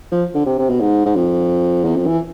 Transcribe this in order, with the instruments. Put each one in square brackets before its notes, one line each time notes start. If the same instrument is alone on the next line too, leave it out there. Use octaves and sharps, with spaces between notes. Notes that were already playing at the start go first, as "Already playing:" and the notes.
[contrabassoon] F3
D3
C3
C3
B2
G#2
G#2
F2
E2
F2
E3